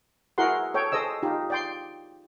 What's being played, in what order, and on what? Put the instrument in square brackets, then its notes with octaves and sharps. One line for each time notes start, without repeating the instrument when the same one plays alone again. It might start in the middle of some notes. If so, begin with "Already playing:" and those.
[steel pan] E4 F#4 G#4 A#4 F#5 C6
A4 C#5 G5
G#4 A4 C5 D#5 E6
D#4 F4 G4
D5 G5 C6